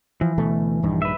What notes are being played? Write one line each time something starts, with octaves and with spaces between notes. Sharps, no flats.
E3 F3
D2 B2 A3
A#1 G2 D#3
B4 E5